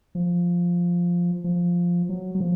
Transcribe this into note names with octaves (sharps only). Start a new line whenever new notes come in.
F3
F3
F#3
F#3
F3